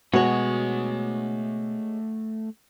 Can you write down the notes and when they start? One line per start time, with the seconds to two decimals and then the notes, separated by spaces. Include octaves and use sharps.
0.14 B2 G#3 A3 F#4 C#5 F#5